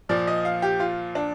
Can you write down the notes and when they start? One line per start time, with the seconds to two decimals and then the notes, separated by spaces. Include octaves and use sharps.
0.09 A#2 F3 D5
0.27 D#5
0.45 F5
0.62 G4
0.80 F4
1.15 D4